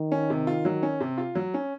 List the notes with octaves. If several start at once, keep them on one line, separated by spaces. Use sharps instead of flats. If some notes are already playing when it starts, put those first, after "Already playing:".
Already playing: D#3
C#4
C3
F4
F#3
C#4
C3
F4
F#3
C#4